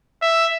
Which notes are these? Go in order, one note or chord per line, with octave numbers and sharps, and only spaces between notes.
E5